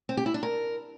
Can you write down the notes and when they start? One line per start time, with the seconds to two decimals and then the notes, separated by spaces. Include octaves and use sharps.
0.09 C4
0.17 G4
0.26 E4
0.34 D4
0.43 A#4